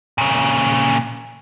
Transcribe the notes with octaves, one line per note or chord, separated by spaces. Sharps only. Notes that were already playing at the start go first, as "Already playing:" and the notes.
A#2 C#3